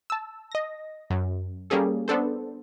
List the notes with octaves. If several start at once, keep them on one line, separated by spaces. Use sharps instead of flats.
A5 E6
D#5 A#6
F#2
G3 A#3 C#4 G#4 A4
B3 D4 A4 C5